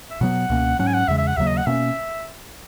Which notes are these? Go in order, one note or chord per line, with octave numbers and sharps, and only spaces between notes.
E5
B2 F#3 B3 F#5
C#2 B2 A#3 C#4
G#2 F#3 C#4 F#5
G#5
F#5
E2 C#3 G#3 E5
E5
F#5
D#2 C#3 F#3 A#3 E5
D#5
F#5
B2 A#3 C#4 E5